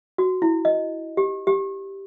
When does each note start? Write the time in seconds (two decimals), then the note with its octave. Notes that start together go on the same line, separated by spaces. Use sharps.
0.18 F#4
0.42 E4
0.65 D#5
1.17 G4
1.47 G4